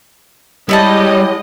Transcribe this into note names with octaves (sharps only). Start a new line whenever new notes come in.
G3 G#3 E4 G4 C#5 D#5 F#5 A5